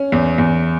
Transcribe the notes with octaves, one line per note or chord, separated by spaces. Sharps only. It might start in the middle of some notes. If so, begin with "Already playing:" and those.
Already playing: C#4
E2
E2